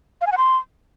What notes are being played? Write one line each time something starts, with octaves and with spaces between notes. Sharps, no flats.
F5
G#5
F#5
C6